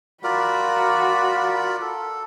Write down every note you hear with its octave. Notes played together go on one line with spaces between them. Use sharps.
F4 F#4 A#4 D5 B5
A4